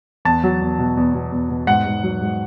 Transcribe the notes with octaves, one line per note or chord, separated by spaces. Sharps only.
E2 A5
F#3
E2
B2
E2
B2
E2
B2
G#2 F#5
G#2
F#3
G#2